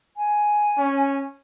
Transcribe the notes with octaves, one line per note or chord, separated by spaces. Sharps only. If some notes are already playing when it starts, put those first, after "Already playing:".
G#5
C#4